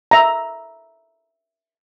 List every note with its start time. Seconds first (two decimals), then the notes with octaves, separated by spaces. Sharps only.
0.11 E5 A#5